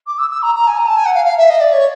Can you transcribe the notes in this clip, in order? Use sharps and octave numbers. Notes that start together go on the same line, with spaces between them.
D6
E6
E6
A#5
A#5
G#5
A#5
A5
G#5
F#5
F5
F5
E5
D#5
D5
C#5